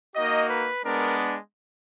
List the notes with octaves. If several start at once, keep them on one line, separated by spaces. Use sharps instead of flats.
A#3 D#4 F#4 D#5
B4
G#3 B3 D4 A#4